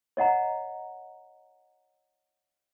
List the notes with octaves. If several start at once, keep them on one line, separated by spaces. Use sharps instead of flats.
C#5 D#5 F#5 A#5